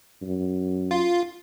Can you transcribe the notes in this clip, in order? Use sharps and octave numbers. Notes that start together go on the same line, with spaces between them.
F#2
F4